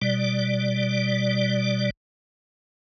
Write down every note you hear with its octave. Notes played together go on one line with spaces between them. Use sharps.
B2 G3 D5